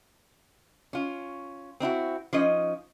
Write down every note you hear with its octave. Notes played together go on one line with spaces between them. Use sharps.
C#4 F4
C4 D4 E4 F#4
F3 C#4 D#4 D#5